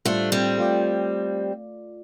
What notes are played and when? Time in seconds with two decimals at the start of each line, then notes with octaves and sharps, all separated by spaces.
0.05 A2 G3 A3 D4 F4 C5
0.32 G3 C4
0.58 A3 F4 D5